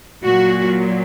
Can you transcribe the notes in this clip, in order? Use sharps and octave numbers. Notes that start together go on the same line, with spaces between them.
A#2 F#3 F#4